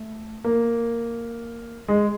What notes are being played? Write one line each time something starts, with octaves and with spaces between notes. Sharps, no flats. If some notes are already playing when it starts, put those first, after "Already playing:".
Already playing: A3
A#3
G#3